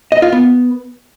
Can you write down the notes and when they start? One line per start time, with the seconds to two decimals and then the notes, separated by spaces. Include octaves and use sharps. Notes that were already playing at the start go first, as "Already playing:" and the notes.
0.12 D#5
0.22 F4
0.32 B3